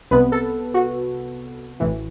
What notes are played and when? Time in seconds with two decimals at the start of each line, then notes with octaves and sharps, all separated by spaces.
0.11 C2 C3 G3 B3 B4
0.32 A4
0.74 F#4
1.80 A1 A2 E3